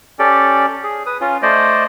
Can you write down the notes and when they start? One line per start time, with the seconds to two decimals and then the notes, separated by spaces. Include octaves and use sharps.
0.19 C#4 G4 A4 D5
0.83 G#4
1.06 B4 D#6
1.21 C#4 F4
1.42 A3 C5 D5 D#5